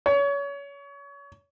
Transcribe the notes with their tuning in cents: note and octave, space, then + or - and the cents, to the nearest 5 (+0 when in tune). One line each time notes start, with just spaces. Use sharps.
C#5 +30